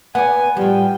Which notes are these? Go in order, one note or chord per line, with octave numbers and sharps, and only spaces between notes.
B3 D5 F#5 G#5
A2 F3 G3 G5